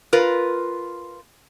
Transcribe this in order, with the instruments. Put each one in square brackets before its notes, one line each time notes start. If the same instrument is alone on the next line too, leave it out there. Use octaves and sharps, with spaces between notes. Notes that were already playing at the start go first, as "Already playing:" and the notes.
[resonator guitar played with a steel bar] F4 A#4 B4